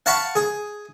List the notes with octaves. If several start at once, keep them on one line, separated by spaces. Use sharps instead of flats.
F5 F#5 A5 B5 C#6
G#4